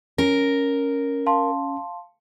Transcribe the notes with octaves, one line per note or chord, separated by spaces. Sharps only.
C#4 A#4
F5 A5 C6